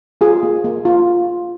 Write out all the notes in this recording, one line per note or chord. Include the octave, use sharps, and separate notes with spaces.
F4 G#4
A#3
A#3
F4